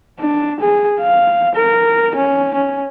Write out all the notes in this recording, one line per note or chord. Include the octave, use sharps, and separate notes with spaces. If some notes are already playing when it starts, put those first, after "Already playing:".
D4
G#4
F5
A#4
C#4
C#4